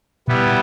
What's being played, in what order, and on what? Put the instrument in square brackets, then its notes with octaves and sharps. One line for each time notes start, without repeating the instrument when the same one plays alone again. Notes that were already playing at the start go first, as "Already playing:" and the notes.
[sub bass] B2 [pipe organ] G3 B3 E4